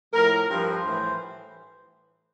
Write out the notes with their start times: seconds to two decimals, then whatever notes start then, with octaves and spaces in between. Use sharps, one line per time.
0.13 A2 F3 A#4
0.49 G2 F3 C5
0.84 A2 E3